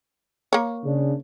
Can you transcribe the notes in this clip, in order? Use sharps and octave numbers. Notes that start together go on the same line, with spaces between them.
A#3 C#5
C#3 D4